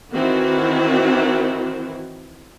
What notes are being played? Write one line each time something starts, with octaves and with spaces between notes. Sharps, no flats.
D#3 E3 C4 E4 F#4